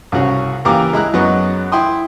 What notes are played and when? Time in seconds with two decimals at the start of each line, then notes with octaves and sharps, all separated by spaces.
0.12 C2 C#3 C#4 F#4 G#4
0.65 C#2 E3 A#3 G4 A#5 D6
0.93 G#3 E4 A#5 F#6
1.13 F#2 F#3 G#3 B3 D#5 C#6
1.72 E4 G5 C6 D#6